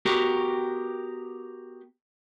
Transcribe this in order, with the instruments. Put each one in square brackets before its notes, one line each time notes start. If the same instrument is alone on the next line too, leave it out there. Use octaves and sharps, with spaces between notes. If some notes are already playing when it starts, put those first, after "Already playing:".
[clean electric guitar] B3 F#4 G4 A#4